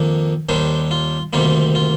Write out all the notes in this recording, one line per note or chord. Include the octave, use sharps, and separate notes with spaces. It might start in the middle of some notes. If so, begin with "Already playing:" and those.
Already playing: F2 D#3 A#3 D4
D#2 D#3 G3 D4 C5
F4
D2 C3 D#3 G3 A#3 F4
F4